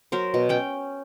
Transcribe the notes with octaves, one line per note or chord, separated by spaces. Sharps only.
F#3 A#4 C5
B2
C#4 G5